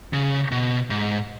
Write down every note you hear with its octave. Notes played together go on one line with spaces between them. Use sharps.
C#3
B2
G#2